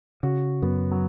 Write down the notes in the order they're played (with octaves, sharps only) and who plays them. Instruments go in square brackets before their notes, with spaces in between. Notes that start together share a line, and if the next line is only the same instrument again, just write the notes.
[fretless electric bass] C#3 [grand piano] F#4
[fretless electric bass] F#2 [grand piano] B3
[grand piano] F#3